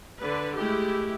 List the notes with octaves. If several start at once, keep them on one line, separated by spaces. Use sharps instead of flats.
D3 B4
G#3 A3 E4 G4